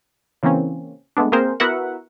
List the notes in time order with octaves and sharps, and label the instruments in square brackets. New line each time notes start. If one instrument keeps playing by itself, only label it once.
[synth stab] C#3 E3 A#3 C4 C#4
G#3 A3 B3 D4
A#3 C4 G#4 A#4 C5
B3 E4 F#4 A#4 E5 F#5